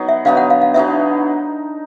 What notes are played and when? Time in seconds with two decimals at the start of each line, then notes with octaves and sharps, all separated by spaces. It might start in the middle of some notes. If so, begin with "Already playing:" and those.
Already playing: F#3 B3 D#4
0.09 E5
0.25 D3 F#3 B3 D#4 F5
0.37 F#5
0.50 F5
0.62 F5
0.74 D3 F#3 B3 D#4 E5